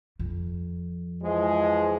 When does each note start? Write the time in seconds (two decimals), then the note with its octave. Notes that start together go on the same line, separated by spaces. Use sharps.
0.19 F2
1.22 E3 F3 G#3